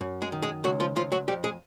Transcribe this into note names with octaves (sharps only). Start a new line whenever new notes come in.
F#2
G#3 G#4
D#3
G#3 G#4
C#2 F#3 F#4
F3 F4
C#2 F3 F4
F#3 F#4
F2 G3 G4
G#3 G#4